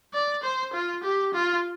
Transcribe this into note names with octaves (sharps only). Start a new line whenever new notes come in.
D5
C5
F4
G4
F4